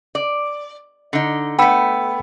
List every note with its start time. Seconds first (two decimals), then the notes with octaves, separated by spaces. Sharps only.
0.15 D5
1.13 D3 D#4
1.59 A3 B3 G5 B5 E6